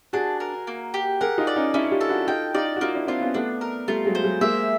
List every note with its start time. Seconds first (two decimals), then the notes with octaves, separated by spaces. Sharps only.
0.13 D4 F#4 G#4
0.40 A#4
0.67 A#3
0.94 G4
1.21 G#4 A#4 F#5
1.38 D#4 F4
1.47 D5
1.56 C#4 D#4
1.74 C#4 D4 E4
1.91 F4 G4
2.01 A4
2.09 E4 F#4
2.27 D#4 F4 G5
2.54 D#4 F4 D5
2.76 F#4
2.81 A#3 D#4 F4
2.95 D4 E4
3.08 C4 D4 F4
3.21 B3 C#4
3.34 A3 B3 D4
3.61 A#4
3.88 G3 A3 F4
4.05 F#3 G#3
4.15 C5
4.24 F#3 G#3
4.41 G#3 A#3 E5